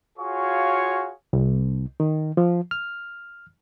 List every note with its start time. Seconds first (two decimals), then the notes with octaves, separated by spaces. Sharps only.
0.18 F4 F#4 G#4 C#5 F5 C#6
1.33 C2
2.00 D#3
2.37 F3
2.71 F6